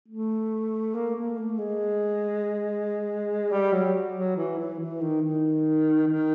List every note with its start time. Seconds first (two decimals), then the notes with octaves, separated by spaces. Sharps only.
0.08 A3
0.95 A#3
1.16 A#3
1.37 A3
1.58 G#3
3.51 G3
3.73 F#3
4.15 F#3
4.36 E3
4.58 E3
4.79 E3
5.01 D#3
5.22 D#3
6.08 D#3